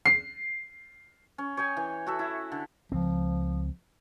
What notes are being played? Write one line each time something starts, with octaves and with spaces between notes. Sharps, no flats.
C7
C#4
C#5 D#5 G5 G#5
E3
F#4 A4 E5
E4
D3
C#2 F3 C4